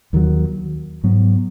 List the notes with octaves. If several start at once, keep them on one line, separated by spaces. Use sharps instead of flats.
D#2 D#3 F#3
G#2 F#3 B3